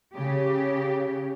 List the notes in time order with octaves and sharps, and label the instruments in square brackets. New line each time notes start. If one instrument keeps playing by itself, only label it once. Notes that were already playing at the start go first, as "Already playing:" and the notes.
[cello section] C#3 G4